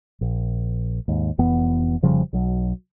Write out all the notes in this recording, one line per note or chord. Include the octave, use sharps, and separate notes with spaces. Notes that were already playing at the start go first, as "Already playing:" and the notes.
A#1
D#2 G#2
F1 F2 E3 B3
F1 C#3 F3 G3
B1 F#3